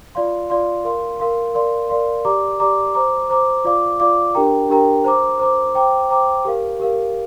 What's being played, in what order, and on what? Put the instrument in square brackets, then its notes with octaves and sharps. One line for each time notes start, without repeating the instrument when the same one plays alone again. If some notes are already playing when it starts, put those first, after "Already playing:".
[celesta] F4 D5 F5 C6
F4 D5 F5 C6
A#4 F5 C6
A#4 F5 C6
A#4 D5 F5 C6
A#4 D5 F5 C6
G4 D5 A#5 D6
G4 D5 A#5 D6
C5 A#5 D6
C5 A#5 D6
F4 D5 F5 D6
F4 D5 F5 D6
D4 G4 A#4 G5 A#5
D4 G4 A#4 G5 A#5
C5 A#5 D6
C5 A#5 D6
C5 G5 A#5 D6
C5 G5 A#5 D6
G4 A#4 F5
G4 A#4 F5